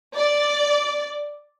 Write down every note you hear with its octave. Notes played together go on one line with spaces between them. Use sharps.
D5